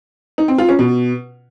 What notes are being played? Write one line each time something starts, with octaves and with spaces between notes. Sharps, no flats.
D#4
C4
F4
C#4
B2